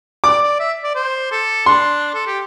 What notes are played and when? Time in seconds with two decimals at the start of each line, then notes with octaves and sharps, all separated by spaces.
0.24 D5 D6
0.42 D5
0.59 E5
0.84 D5
0.95 C5
1.31 A4
1.66 D4 C6
2.14 A4
2.27 G4